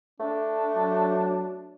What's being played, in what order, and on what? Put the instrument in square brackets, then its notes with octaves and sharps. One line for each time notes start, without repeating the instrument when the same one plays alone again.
[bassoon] A3 [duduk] D4
[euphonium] F#3